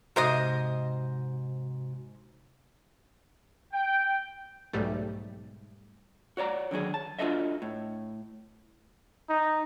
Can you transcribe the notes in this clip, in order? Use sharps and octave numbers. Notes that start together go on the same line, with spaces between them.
G#2 C3 F#4 C5 D#5
G5
B1 G#2 G3 A3
F#4 C#5 D5 A#5
D3 D#3 F#3 G#4
A5
D4 F4 F#4 A4 D#5 E5
A2
D#4